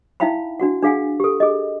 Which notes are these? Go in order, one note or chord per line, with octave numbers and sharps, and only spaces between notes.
D#4 E4 E5 F5 G5 B5
D4 F#4 F#5
D4 G#4 F5 F#5 G#5
G4 A4
G#4 D#5